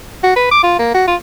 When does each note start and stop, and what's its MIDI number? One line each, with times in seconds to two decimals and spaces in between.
0.23 0.32 66
0.36 0.49 71
0.51 0.62 86
0.63 0.76 65
0.79 0.93 58
0.94 1.05 66
1.07 1.16 65